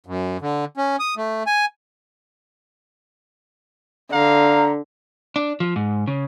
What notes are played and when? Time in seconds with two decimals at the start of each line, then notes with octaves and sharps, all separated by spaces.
0.06 F#2
0.41 D3
0.77 C#4
0.99 D#6
1.17 A3
1.47 G#5
4.12 D3 F5 A#5
5.36 D4
5.60 F3
5.76 G#2
6.07 C#3